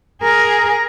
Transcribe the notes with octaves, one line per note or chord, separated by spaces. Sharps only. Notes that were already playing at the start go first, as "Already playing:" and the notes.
G#4 A#4